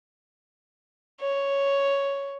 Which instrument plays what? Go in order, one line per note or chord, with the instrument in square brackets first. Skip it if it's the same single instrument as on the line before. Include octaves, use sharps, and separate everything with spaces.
[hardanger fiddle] C#5